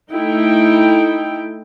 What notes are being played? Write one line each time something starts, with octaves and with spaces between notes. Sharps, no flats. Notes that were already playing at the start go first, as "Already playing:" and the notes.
A3 D#4 E4 G5